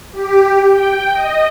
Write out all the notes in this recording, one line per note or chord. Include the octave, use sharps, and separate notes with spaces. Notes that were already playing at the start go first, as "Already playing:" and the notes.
G4
G5
D#5